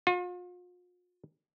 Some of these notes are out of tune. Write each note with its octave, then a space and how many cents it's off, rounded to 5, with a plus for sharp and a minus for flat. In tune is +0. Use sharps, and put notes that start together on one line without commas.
F4 +40